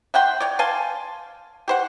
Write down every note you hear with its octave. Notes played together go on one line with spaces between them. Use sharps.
E5 F#5 G5 C6
C#5 D5
F5 G#5 A5 C6
G4 C5 F#5